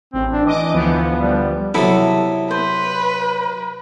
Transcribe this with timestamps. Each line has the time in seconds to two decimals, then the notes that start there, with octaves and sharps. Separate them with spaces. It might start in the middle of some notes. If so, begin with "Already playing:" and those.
0.14 A1 C4
0.33 D4
0.46 E3 D#5 D6
0.73 D2 F3 B3
1.19 G3
1.74 C3 F#3 B3 E4 A4 B5
2.51 B4 C5